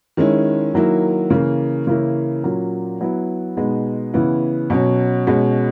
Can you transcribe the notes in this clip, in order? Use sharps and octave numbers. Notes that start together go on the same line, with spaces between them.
D#3 G#3 C#4 E4
D#3 F#3 A#3 E4
C#3 E3 A#3
C#3 E3 A#3 C#4 E4
A#2 F#3 A#3 C#4
F#3 B3 E4
B2 G#3 B3 D#4
C#3 E3 B3 E4
B2 F#3 C#4
B2 G#3 C#4